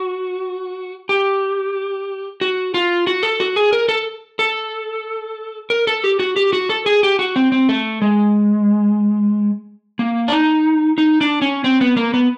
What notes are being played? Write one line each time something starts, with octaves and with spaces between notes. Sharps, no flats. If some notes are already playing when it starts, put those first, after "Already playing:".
Already playing: F#4
G4
F#4
F4
F#4
A4
F#4
G#4
A#4
A4
A4
A#4
A4
G4
F#4
G4
F#4
A4
G#4
G4
F#4
C4
C4
A3
G#3
A#3
D4
D#4
D#4
D4
C#4
C4
B3
A#3
B3